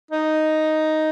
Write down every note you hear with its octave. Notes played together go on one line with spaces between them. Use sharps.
D#4